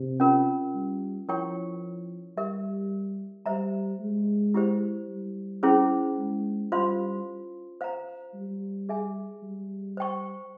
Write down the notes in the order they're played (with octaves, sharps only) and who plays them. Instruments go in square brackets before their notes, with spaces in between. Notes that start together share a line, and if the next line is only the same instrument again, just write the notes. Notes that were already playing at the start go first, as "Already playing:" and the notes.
Already playing: [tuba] C3
[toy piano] C#4 F4 A#4
[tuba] G3
[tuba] F3 [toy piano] E4 A#4 C#5 G5 C#6
[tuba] G3 [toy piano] G4 A#4 E5
[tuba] G3 [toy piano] C5 E5 A#5
[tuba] G#3
[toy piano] E4 G4 C5
[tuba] G3
[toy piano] C#4 E4 G#4 C5
[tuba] G#3
[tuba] G3 [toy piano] F4 C5 F5 C6
[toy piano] C5 F5 A#5
[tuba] G3
[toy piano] G#4 E5 G#5
[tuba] G3
[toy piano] C5 G5 C#6